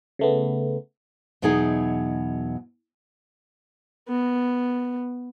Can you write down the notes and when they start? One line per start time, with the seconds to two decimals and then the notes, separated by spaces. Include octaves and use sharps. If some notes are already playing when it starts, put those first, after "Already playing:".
0.19 C#3 A3 B3
1.42 E2 B2 F#3 D#4 G#4 D#5
4.09 B3